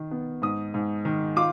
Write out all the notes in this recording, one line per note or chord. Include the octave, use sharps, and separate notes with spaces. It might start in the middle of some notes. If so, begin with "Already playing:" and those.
Already playing: D#3
B3
G#2 D#6
G#2
D#3
F4 D6